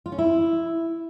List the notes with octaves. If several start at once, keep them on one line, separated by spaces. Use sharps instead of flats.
F4
C#4
E4